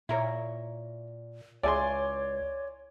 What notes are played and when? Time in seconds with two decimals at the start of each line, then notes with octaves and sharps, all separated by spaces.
0.09 A#2 E4 A#4 C#5
1.63 C#2 E4 G#4 C#5 D5 G#5 C6